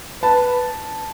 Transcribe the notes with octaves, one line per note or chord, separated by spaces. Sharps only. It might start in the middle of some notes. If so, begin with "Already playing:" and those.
B4 A5